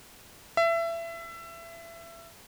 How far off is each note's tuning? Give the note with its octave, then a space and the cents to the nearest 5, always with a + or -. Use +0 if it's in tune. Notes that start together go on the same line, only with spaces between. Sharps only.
E5 +25